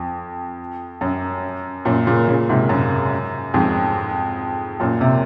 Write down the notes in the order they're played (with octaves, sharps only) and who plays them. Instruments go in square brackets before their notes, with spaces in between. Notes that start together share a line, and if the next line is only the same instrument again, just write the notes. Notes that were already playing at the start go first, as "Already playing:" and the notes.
Already playing: [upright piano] F2
F#2
F#2 A#2
A#2 C#3
A#2 C#3
G#2 C3
F#2
F2 G#2
F#2 A#2
C3